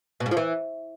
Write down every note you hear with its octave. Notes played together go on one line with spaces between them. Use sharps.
B2
G#2
F3
E3